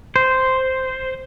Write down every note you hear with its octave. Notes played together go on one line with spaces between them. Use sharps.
C5